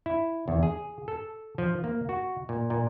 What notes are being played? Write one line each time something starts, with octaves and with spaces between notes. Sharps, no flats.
E4
E2
G#4
A4
F3
A#3
F#4
A#2
A#2